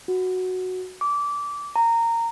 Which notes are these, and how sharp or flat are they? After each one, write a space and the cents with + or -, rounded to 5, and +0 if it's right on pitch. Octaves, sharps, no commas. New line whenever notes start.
F#4 -5
D6 -20
A#5 -15